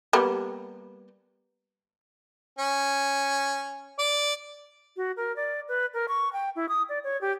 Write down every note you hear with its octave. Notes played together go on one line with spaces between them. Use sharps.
G3 A#3 B3
C#4
D5
F#4
A#4
D5
B4
A#4
C#6
G5
E4
D#6
D5
C#5
G4